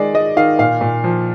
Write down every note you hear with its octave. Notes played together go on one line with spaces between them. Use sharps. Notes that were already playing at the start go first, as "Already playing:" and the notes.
Already playing: D#3 G#3 D5
G#3 D#5
D#3 F5
A#2 F5
A#2
F3